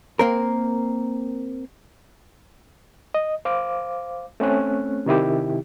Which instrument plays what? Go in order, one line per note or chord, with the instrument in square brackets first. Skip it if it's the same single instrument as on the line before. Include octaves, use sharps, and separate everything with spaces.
[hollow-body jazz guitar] A#3 C4 A#4
[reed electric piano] D#5
C5 F5 D6
A3 C4 C#4 F#6
C3 D#3 E4 G4